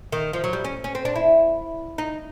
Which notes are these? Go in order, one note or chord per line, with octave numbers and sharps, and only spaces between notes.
D#3
F3
F#3
G3
C#4
C#4
C4
D4
E4
D#4